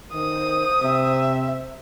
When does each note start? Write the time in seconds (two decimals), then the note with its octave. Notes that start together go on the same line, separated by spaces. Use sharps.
0.13 D#3 C5 D#6
0.83 C3 E5